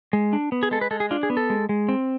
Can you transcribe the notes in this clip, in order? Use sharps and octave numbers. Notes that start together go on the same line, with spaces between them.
G#3
D4
B3
G#4
G#3 A4
B4
G#3 A4
G#4
D4 F4
G#4
B3
A4
G#3
G#3
C4